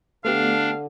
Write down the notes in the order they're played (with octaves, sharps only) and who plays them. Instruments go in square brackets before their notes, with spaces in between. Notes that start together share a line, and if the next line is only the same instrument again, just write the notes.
[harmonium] D3 [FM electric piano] A3 B3 G4 [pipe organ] D4 [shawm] F5